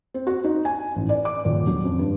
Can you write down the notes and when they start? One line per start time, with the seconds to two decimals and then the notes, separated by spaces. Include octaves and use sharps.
0.14 C4
0.27 F#4
0.44 D#4
0.65 G#5
0.96 A1
1.09 D5
1.25 D6
1.45 D#1
1.67 F#3
1.85 F2
1.99 G2